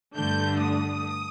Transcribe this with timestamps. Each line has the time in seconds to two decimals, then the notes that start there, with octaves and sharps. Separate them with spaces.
0.16 G2 D3 A3 D4 G6
0.59 D#6